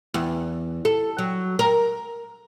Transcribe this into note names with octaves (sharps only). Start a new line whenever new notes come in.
E2
A4
F#3
A#4